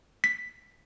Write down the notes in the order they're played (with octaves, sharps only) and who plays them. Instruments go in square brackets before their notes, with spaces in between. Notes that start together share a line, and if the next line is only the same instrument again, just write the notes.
[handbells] B6